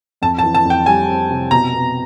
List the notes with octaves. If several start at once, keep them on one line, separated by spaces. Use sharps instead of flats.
F2 A5
A5
E3
A5
F2
G5
G3 G#5
C4
C3
B2 A#5
B3